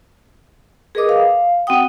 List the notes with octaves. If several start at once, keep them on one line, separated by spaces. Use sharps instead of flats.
G#4 A#4 B4 D#5 D6 D#6
F5
C4 F#4 F#5 G5 D#6